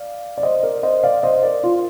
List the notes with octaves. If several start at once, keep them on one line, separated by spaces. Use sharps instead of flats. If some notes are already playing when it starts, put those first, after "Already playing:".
Already playing: D5 F5
D5
C5 D#5
A#4 D5
C5 D#5
D5 F5
C5 D#5
A#4 D5
F4